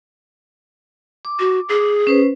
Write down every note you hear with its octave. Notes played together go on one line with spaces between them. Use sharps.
D6
F#4
G#4
C#4 B4 C5